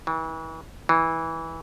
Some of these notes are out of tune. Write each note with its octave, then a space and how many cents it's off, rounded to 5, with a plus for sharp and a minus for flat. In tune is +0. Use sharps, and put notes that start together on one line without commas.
E3 -35
E3 -15